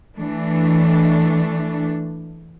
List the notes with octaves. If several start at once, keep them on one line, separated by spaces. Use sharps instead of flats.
E3 A3 D4